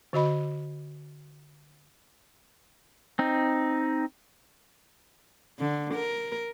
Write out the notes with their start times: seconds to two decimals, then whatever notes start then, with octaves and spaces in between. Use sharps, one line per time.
0.13 D3 F#4 D#5 B5
3.19 C4 D#4
5.59 D3
5.94 A#4